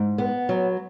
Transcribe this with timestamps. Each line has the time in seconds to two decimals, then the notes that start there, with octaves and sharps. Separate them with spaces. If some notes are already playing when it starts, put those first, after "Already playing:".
Already playing: G#2
0.18 B3
0.49 F#3